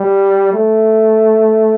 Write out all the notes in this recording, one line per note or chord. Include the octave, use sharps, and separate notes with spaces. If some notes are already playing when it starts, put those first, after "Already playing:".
Already playing: G3
A3